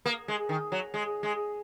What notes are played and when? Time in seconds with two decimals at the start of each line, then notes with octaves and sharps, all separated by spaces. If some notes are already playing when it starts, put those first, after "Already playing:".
0.06 A#3
0.28 G#3
0.49 D#3
0.72 F#3
0.94 G#3
1.23 G#3